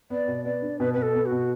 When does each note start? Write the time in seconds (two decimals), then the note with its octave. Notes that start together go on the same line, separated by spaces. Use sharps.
0.10 B3 D5
0.28 B2
0.45 B3 D5
0.62 D4
0.79 B2 B4
0.94 B2 B4
1.02 A4
1.14 B3
1.26 F#4
1.32 B2